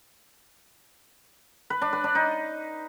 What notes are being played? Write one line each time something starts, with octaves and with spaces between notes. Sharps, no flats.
B4
D4
B4
D4
D#4